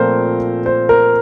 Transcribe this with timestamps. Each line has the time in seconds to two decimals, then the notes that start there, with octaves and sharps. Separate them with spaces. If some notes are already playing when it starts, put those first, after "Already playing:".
Already playing: A#2 F3 A3 C4 A#4 C5
0.66 C5
0.89 A#4